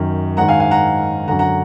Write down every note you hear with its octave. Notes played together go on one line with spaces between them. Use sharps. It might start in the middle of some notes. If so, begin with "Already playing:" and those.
Already playing: F#2 D#3
G#2 D#3 F#5 A#5
F5 G#5
F5 G#5
F#5 A#5
F#2 D3 F#5 A#5
F#5 A#5